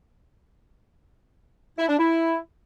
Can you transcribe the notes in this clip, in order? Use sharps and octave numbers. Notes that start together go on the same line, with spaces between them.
E4
D4
E4